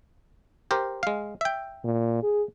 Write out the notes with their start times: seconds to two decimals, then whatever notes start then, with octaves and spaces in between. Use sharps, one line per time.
0.71 G4 A#4 C5
1.03 G#3 F5
1.41 E5 G5
1.85 A#2
2.23 G#4